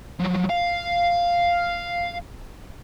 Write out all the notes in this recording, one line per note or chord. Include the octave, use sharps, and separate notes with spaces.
F3 F#3
F5